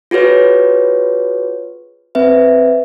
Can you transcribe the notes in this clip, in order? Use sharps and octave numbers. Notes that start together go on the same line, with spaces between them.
F4 F#4 G#4 B4 C#5
C4 B4 E5